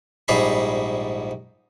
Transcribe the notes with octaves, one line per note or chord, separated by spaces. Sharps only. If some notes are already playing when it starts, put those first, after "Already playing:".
A#1 G#2 G3 G#4 B5